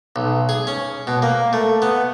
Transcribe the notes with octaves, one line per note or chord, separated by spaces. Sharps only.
B1
G#4
C#4
B2
A#3
A3
B3